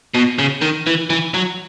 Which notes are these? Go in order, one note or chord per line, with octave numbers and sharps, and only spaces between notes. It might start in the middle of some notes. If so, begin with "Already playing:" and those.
B2
C#3
D#3
E3
E3
F#3